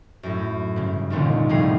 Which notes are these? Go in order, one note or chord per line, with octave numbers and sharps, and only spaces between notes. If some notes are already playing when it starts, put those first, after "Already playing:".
F#2 A2
G2 C#3
E1 C2 A#2 D3 D#3
F1 A2 C3 G#4 F5 C7